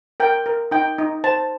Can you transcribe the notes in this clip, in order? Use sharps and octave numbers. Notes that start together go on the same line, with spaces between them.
A#4 G5
A#4
D#4 G5
D#4
C5 A5